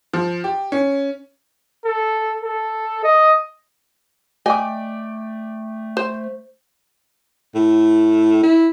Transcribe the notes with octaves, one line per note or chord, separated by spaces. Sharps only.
F3
G4
C#4
A4
A4
D#5
A3 D5 D#5 G5 G#5 D6
C5
A2
E4